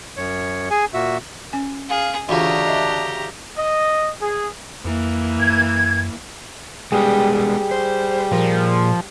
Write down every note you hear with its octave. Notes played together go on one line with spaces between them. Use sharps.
F#2 C#5
G#4 G#5
A#2 F#4 E5
C#4 G#5
G#4 F5
D2 C#3 E3 D4 F4 G4 A#5
D#5 E5
D#5
G#4
F2 E3 A#3
F#2 G#6
G3 G#3 B3 G#4
G3
C5
A#2 F3 A#4